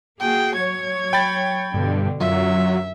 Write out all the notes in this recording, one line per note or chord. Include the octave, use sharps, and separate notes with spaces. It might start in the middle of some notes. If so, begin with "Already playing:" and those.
A#3 F#4 G#4 G5
F#3 C#5 G#6
G5 B5 A6
G2 B2 D3
F#2 F#3 F4 E5